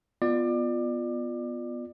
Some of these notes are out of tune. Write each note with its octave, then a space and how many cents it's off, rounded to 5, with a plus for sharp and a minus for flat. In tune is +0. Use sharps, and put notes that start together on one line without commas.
B3 +0 F4 +0 D5 +25